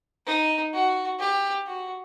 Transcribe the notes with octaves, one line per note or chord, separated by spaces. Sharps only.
D#4
F#4
G4
F#4